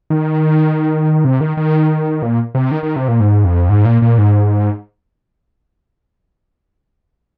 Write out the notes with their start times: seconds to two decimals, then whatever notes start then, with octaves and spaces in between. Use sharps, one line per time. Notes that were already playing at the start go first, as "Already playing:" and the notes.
0.10 D#3
1.25 C3
1.41 D#3
1.57 D#3
2.22 A#2
2.55 C3
2.71 D#3
2.83 D#3
2.96 C3
3.08 A#2
3.20 G#2
3.45 F2
3.69 G#2
3.85 A#2
4.02 A#2
4.18 G#2